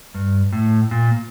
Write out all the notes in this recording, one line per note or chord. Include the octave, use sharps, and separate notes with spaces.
G2
A2
A#2